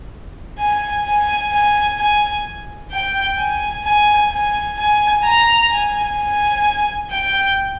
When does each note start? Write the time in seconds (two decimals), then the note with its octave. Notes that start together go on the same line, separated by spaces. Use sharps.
0.59 G#5
1.05 G#5
1.52 G#5
1.98 G#5
2.91 G5
3.38 G#5
3.84 G#5
4.31 G#5
4.78 G#5
5.24 A#5
5.71 G#5
6.17 G#5
7.10 G5